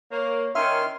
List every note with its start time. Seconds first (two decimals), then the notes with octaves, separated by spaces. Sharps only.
0.12 A#3 C#5
0.55 D#3 C#4 A#4 E5 C6 F6